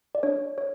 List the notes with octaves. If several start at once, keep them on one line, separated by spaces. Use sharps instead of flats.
D5
D4 C#5
C#5